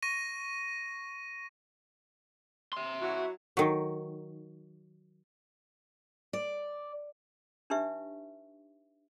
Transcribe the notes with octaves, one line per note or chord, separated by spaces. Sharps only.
C#6 A#6 D#7
E5 C6
F#3 E4 F#4
D#3 F#3
D5
D4 D#4 G4 B4 E5 C#6